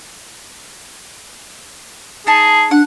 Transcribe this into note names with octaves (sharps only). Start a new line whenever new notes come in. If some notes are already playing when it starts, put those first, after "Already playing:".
D#4 G#4 A5
D4 F#5